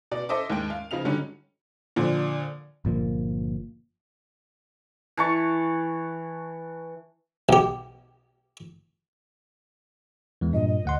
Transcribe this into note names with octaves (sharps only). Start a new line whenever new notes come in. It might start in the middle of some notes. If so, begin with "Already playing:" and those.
B2 D5
A4 C5 D#5 E5 D6
D#2 G#2 G#3 G5 D7
F5
C#3 F3 D#4 F5 F7
G#2 D3 F#3 G3 C#4 D#4
A#2 D3 F3
G1 A#2 F3 A#3
E3 A5 C#6
B1 G4
E2 E3 G#3
G2 A#2 D#5
D#5
D2 F#5 C6